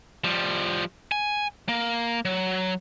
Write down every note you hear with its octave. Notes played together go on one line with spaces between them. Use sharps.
F3 G3
G#5
A#3
F#3